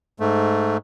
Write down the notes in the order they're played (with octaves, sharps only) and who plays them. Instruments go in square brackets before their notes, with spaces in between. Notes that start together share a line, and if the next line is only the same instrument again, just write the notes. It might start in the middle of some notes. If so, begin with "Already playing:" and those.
[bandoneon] G#2 A3